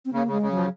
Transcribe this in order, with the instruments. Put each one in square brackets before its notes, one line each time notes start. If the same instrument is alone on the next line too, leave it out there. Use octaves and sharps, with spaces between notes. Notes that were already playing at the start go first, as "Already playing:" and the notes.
[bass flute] C4
[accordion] C#3 [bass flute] A#3
[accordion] C#3 [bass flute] G#3
[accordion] C#3
[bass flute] F#3
[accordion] F3